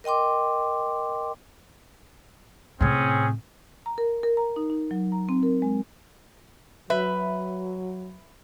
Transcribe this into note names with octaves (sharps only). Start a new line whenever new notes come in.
A#4 D#5 G5 C6 D6
A2 C3 C4 C#4 G#4
A#5
A#4
A#4
A#5
D#4
D#4
F#3
A#5
C4
A#4
G#3
F#3 B4 E5